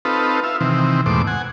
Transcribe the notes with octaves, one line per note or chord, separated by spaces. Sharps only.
C4 D#4 F4 A4 B4
F4 E5
C3 D#3 E3 C4
E2 G#2 B2 A3 C5 D6
F#5 G#5